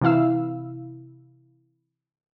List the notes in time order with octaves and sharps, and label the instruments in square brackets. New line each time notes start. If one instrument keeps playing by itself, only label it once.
[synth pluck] C3 E3 E4 F5 E6